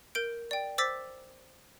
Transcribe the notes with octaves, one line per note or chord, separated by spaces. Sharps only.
A#4 G6 D7
D5 G5
C5 D6 E6 A6 B6